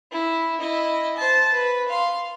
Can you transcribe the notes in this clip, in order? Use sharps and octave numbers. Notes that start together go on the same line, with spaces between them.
E4
E4 D#5
C5 A5
B4
F5 C6